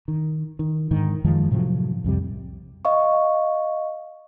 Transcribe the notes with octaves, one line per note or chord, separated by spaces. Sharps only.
D#3
D#3
G#2 D3 D#3
F#2 D#3 F3 G#3
A2 C3 F3 F#3
C2 F2 C3 G3
D#5 F5 C#6